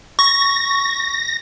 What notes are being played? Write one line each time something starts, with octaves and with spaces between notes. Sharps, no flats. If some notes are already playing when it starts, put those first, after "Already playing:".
C#6 A#6